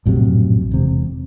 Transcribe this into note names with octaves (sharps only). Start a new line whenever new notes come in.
A#1 F#2 A2 C3
E1 C3